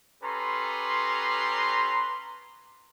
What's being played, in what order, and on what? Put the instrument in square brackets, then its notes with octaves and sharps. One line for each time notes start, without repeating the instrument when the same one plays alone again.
[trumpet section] C#4 G4 A4 B4 A#5 C6